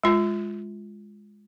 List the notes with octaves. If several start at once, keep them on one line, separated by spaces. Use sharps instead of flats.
G#3 F4